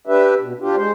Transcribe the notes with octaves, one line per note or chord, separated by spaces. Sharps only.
D4 G4 B4 E5
B2
D4 F4 G4
G#3 C5